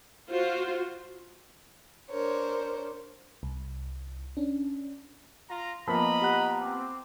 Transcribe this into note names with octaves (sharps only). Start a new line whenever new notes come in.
F4 F#4 C5
D4 A#4 C5 C#5
C2
C#4 D4
F4 A#5
F3 A#3 B3 D#5 A#5 B5
G4 F#5 F#6
C4 D6